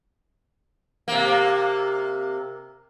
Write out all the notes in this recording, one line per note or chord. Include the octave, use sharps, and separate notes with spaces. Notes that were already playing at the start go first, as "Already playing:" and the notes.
C3 A#3